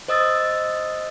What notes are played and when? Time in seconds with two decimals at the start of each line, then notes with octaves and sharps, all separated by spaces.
0.08 C5 D#5 D#6 E6 A6